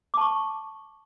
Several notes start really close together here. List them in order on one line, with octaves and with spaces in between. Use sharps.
D6 A5 C#6